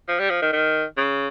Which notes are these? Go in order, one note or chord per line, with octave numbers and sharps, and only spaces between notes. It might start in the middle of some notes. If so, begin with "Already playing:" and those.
F3
G3
F3
D#3
D#3
C#3